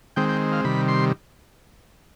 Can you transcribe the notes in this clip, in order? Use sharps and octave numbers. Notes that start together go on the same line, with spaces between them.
D#3 G#3 C4 G5
G5
F5
C3 D#3 G3 B5
C6